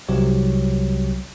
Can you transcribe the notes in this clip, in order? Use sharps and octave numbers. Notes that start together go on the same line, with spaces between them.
C2 F#3 G4 C#5